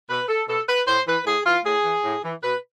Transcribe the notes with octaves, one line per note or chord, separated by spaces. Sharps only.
B2 B4
A4
B2 A4
B4
A2 C5
E3 B4
A2 G#4
E3 F4
A2 G#4
E3
A2
E3
B2 B4